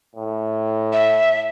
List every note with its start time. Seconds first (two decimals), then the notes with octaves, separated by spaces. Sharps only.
0.16 A2
0.93 E5